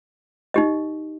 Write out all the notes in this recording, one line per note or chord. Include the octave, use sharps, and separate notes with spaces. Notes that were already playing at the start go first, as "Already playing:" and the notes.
D#4 G4 D#5